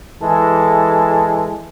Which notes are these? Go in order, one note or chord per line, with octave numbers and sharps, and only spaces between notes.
E3 G#3 A4